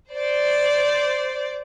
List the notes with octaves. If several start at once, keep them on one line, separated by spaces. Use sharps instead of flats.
C5 D5